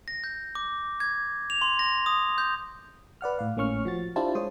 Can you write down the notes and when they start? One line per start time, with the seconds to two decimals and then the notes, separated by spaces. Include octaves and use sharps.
0.08 A#6
0.24 G6
0.55 D6
1.00 G#6
1.50 F7
1.62 C6
1.79 A#6
2.06 D#6
2.38 G6
3.21 B4 D5 F#5 F6
3.39 A2 F5
3.56 G#1 A2 A#3 C#4 C#6 F6
3.85 F3 F#4 A6
4.16 D4 E4 F4 G4 C5 A5
4.35 G#3 C5 C#5 D#6